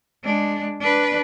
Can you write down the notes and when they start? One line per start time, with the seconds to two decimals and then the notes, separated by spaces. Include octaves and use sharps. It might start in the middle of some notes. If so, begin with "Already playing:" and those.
0.24 G#3 D4
0.80 D4 B4